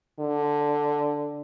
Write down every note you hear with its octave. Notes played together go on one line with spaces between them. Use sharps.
D3